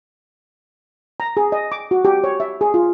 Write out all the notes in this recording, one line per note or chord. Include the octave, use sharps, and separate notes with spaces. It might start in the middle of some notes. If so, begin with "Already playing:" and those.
A#5
G#4
D#5
D6
F#4
G4
C#5
E5
G#4
F4